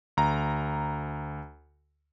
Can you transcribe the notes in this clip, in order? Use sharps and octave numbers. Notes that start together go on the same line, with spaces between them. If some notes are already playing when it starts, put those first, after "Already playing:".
D2 A#5